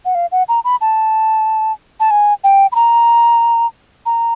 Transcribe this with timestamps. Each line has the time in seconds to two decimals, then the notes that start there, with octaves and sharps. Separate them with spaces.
0.05 F#5
0.15 F5
0.32 F#5
0.48 A#5
0.65 B5
0.81 A5
2.00 A5
2.11 G#5
2.44 G5
2.72 B5
2.75 A#5
4.06 A#5